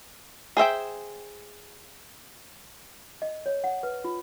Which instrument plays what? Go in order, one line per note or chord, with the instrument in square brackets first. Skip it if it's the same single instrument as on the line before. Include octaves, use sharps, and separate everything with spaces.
[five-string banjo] G#4 C5 E5 G5
[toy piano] D#5
C#5
F#5
B4
F4